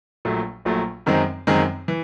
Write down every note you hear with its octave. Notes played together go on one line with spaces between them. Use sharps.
A#1 A#2 F#3 A3
A#1 A#2 F#3 A3
F#2 D#3 G#3 C4
F#2 D#3 G#3 C4
E3